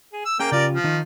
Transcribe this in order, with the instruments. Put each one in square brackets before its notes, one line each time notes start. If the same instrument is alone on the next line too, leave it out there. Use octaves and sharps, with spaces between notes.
[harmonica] G#4
E6
[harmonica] A#3 G5 [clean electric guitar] C#4 G#4 A#4
[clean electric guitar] C#3 F4 G4 [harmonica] A#4 D5
[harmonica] F3
[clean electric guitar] D#3 D#4